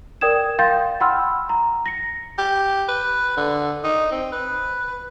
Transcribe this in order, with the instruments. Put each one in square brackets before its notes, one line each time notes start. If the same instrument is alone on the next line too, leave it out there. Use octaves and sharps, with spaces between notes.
[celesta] A#4 D5 G5 D#6 G#6 E7
F5 G5 C6 G6 A6
F#5 G5 B5 C6 E6 F6
A#5
A#6 C#7
[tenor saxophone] G4
B4
D3
D#4
C4
B4